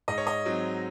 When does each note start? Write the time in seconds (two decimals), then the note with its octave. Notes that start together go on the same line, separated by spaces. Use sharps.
0.08 G#2 D#5
0.18 C#5
0.27 D#5
0.45 F#3 C4 D#4